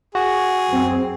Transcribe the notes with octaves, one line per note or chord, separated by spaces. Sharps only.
F#4 G#4
F#2 C4